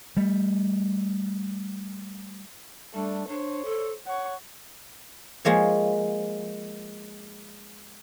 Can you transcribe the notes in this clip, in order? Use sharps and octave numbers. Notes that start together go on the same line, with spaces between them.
G3 A3
G3 A3 D4
D4 C5 C#5
A4
C#5 F#5 C#6
F3 G#3 A#3 C#5